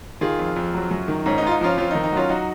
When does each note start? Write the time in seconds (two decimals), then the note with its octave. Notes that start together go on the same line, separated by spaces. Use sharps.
0.21 D#3 F4 G#4
0.39 F2
0.56 F2
0.74 F#3
0.91 F#2
1.08 D#3
1.26 G#2 C#4
1.38 D#4
1.42 G#2 F4
1.51 D#4
1.61 F3 C#4 F4
1.77 F2 C#4 F4
1.91 D#4
1.95 D#3
2.04 D#4
2.12 F#3 C#4 F4
2.29 F#3 D#4 F#4